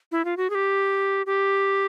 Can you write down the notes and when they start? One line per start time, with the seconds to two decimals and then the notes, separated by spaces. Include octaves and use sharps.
0.12 E4
0.25 F4
0.37 F#4
0.50 G#4
0.55 G4
1.26 G4